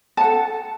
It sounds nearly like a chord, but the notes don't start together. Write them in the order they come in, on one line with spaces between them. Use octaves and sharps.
A5 F#5 A4